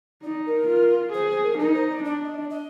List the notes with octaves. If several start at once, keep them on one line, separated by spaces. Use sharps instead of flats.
D#4 D5
A#4
F4
G#4 C5
C5
A#4
D#4 A#4
C5
D5
D4 D5
D#5
D5
D#5